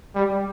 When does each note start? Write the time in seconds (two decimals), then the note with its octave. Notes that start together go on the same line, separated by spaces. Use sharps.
0.15 G3